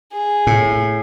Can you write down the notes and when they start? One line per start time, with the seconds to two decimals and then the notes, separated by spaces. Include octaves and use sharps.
0.13 G#4
0.47 A2